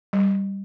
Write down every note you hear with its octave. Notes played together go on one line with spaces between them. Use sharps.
G3